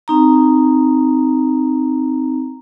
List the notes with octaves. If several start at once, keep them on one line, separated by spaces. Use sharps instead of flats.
C4 D#4 A#5